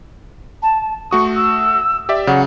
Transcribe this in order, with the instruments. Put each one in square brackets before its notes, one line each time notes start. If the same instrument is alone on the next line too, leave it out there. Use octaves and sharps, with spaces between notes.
[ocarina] A5
[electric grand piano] A3 F#4 D#6 [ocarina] C#6
[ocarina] E6
[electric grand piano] G4 D5 E5
[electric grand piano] C#3 F#3 [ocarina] F#5